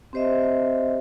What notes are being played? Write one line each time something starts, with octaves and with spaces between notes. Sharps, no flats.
C4 G4 C5 D#5 E5